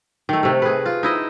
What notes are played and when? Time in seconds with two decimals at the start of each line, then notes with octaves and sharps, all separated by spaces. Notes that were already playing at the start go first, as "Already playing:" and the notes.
0.29 D#3 A3
0.43 C3 A3
0.62 G#4 B4
0.86 F4
1.03 D#4 E4 D#5